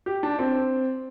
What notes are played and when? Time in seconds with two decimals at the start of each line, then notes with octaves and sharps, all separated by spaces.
0.06 G4
0.23 D4
0.39 C4